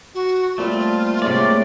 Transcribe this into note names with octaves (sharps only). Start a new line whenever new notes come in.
F#4
A#2 G3 A3 C4 F4
G#2 C3 A3 G#4 C#5 D5 E5